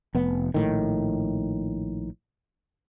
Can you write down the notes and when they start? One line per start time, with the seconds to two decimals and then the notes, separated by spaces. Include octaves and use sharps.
0.15 F1 B3
0.54 A#1 A2 D#3